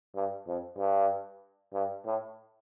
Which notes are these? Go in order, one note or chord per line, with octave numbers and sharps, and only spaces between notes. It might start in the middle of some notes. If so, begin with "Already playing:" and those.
G2
F2
G2
G2
A2